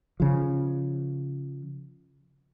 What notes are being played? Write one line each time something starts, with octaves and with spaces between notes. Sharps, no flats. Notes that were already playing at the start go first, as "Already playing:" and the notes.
C#3 F3